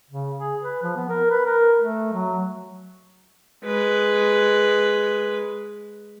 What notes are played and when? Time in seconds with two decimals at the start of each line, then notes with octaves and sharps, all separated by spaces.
0.10 C#3
0.38 G#4
0.63 B4
0.83 F3
0.96 B3
1.09 A#4
1.30 B4
1.46 A#4
1.79 A3
2.13 F#3
3.65 G#3 B4